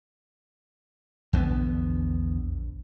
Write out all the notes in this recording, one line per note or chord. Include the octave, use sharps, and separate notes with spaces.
A#1 E2 D3 B3